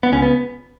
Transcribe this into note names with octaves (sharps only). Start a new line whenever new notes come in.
B3
C#2 C#4
B3